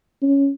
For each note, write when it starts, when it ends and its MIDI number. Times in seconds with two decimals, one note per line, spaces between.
0.23 0.50 61